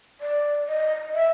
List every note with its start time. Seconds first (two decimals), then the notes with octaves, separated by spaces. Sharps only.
0.21 D5
0.68 D#5
1.15 E5